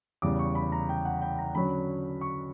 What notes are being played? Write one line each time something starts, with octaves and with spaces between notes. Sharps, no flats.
E2 C#3 G3 D6
C#6
B5
A#5
G5
F#5
G5
A#5
D3 F#3 C#4 B5
C#6